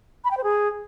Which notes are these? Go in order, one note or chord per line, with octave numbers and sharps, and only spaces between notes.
B5
G5
C5
G#4